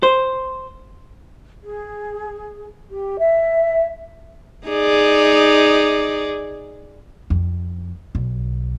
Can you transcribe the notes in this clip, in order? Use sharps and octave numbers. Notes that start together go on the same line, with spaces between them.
C5
G#4
G4
E5
D#4 G#4 D5
F2
B1